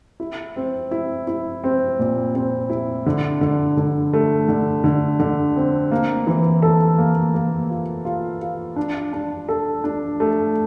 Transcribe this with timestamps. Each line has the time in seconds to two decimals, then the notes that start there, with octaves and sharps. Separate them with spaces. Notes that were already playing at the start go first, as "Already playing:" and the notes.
0.20 E4
0.56 C4
0.91 E4
1.27 E4
1.64 C4
1.99 A#2
2.35 C4
2.70 E4
3.06 D3
3.41 D3
3.77 D3
4.14 A3
4.48 D3
4.84 D3
5.20 D3
5.56 C4
5.91 A#3
6.27 E3
6.62 A4
6.98 A#3
7.34 A#3
7.70 F4
8.05 F4
8.41 F4
8.76 D4
9.13 D4
9.49 A4
9.84 D4
10.20 A3